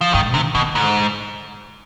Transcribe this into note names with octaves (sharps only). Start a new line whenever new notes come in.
F3
G#2 D#3
C3 D#3
B2 D#3
G#2 D3